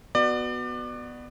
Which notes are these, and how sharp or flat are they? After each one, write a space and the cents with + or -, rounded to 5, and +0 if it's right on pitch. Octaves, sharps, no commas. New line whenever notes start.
B3 +0 F#4 +0 D5 +30